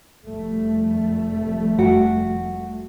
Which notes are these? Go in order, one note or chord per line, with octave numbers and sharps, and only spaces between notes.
F1 G3 A3
F#4 F#5 G5